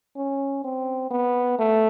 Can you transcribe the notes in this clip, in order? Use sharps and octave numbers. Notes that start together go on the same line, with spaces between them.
C#4
C4
B3
A3